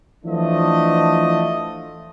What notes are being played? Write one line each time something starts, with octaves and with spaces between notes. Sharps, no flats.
E3 F3 A3 D4 D#5